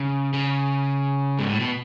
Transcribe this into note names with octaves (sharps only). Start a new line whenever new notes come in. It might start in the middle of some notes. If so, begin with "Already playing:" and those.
Already playing: C#3
C#3
G#2
A2
B2